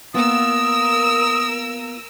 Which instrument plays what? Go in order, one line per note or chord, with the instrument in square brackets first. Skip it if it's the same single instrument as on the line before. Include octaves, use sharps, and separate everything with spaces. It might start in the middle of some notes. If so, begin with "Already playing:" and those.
[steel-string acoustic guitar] A#3 B3 F4 [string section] A#4 E6 [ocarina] D#6